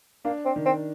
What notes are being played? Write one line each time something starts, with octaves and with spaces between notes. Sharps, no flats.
A#3 D4
C4
D#3
C4